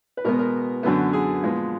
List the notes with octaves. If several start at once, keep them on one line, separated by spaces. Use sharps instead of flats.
B4
B2 G#3 B3 A#4
A#4
F#2 D3 F#3 B3
G#4
A#2 F3 G#3 B3